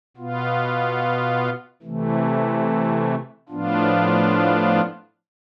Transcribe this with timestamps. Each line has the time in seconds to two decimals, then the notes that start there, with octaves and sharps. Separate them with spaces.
0.17 B2 B3 F4
1.83 C3 E3 A3
3.49 A2 F3 B3 D4 F4